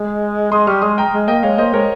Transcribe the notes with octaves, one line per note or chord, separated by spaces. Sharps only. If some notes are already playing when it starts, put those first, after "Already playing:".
Already playing: G#3
G#3 C6 D#6
G3 C#6 F6
G#3 C6 D#6
G5 A#5
G#3
A#3 D#5 G5
G#3 C#5 F5
A#3 C5 D#5
G#3 A#4 C#5